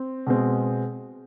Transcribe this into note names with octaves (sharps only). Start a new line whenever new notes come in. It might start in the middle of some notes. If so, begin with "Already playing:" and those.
Already playing: C4
B2 G#3 C4